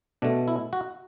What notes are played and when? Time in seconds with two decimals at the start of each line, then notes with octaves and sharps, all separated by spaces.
0.22 B2 A3 D4
0.48 E4
0.73 F#4